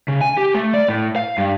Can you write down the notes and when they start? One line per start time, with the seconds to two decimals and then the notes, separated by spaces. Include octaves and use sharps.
0.08 C#3
0.21 G#5
0.37 G4
0.54 A3
0.74 D5
0.88 A2
1.16 F5
1.38 G2